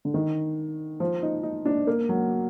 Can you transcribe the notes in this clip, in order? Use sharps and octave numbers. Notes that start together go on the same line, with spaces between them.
D3
D#3
F3
D#4
D#4
D4
A#3
F#3